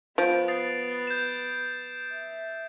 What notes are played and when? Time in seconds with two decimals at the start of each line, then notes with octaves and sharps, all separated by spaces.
0.18 F3 B3 D7
0.48 D#6 A6 C7
1.07 G6 E7
2.13 E5